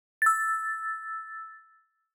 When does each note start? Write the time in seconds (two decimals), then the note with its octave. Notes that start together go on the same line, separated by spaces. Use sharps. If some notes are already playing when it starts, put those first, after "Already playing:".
0.22 E6 A6